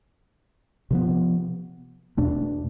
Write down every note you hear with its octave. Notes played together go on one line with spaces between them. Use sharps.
C3 F3 B3
E2 B2 A3 D4